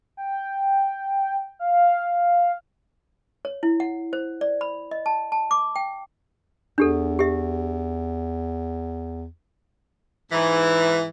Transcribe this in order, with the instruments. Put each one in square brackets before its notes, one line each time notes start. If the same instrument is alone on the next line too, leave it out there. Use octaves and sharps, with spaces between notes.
[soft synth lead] G5
F5
[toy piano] C#5
E4
F#5
C5
D5
B5
D#5
A5
A5
D6
G5
[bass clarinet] E2 [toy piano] D4 G4 A4
[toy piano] G4 E5
[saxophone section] G#2 E3